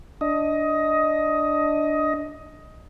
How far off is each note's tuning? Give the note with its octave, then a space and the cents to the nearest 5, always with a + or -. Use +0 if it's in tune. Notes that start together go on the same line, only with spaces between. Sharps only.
D4 +5 D#5 +15